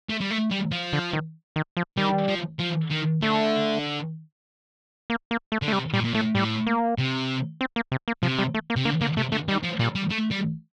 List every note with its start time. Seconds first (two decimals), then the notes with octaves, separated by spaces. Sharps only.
0.10 A3
0.21 G3
0.31 A3
0.51 G3
0.72 F3
0.93 D3
1.13 D#3
1.56 D#3
1.77 F3
1.97 D#3 G3
2.29 F3
2.60 F3
2.90 D#3
3.22 D3 A3
5.10 A#3
5.31 A#3
5.52 A3
5.62 D3
5.68 A3
5.72 C3 G3
5.94 A#2 G3
6.04 A#2
6.14 A2 A3
6.35 A2 G3
6.67 A#3
6.98 C3
7.61 C4
7.76 A#3
7.92 C3
8.08 A#3
8.23 C3 F3
8.39 G3
8.54 A3
8.70 A#3
8.76 C3
8.85 D3 A#3
9.01 D3 A#3
9.17 C3 A3
9.32 D3 A3
9.48 D#3 G3
9.63 F3
9.79 A#2 G3
9.95 G3
10.10 A3
10.31 G3